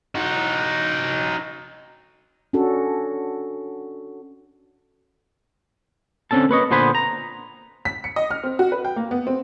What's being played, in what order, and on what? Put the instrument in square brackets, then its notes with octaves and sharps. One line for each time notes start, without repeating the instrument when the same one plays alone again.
[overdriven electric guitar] D#4 F#4
[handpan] C#4 D4 F#4 A4
[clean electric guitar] D3 C4 C#4 A4 A5
A#3 B4 C#5 D#5
A#2 D3 B3 C5 G#5 B5
A#5
[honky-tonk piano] B6
C#7
D#5
F6
C4
F#4
B4
G5
A#3
B3
C4